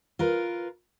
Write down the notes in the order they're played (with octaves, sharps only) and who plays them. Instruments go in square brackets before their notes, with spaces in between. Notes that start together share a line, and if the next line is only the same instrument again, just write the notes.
[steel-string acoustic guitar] F4 A#4 B4